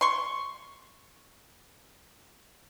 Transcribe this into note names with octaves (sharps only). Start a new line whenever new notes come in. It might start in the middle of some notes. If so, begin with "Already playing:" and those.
C6 C#6